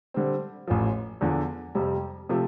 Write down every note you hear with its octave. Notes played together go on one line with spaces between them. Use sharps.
D3 G3 C4
A1 A2 F3
E2 D3 F3
F2 C3 G3
C3 F3 A3